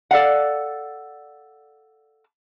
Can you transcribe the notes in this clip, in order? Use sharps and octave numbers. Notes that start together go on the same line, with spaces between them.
A4 D5 F5 F#5